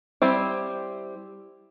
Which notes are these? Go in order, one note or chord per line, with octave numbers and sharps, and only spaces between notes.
G3 C4 E4